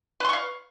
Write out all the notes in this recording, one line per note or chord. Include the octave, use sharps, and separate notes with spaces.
B4 F5 C6 C#6